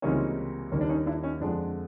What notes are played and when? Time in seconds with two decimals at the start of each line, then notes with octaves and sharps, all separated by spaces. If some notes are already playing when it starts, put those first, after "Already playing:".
0.02 C#2 C3 E3 G3 A#3 C#4 D#4
0.72 D#2 D#3 G3 A#3 C#4
0.81 D4
0.89 C#4 D#4
1.06 D4 E4
1.23 C#4 D#4
1.40 F2 D3 F3 G#3 D4